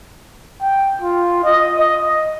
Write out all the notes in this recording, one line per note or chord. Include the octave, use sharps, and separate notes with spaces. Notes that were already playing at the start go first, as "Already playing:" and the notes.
G5
F4
D#5
D#5